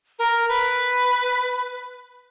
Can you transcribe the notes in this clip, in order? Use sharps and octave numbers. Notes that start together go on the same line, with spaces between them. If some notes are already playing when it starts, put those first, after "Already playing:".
A#4
B4